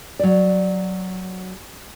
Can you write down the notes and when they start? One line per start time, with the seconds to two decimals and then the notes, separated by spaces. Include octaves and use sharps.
0.19 F#3 D5